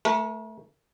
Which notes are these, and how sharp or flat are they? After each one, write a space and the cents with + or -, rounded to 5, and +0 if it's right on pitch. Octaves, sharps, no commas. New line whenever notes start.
A3 +0 A#4 +45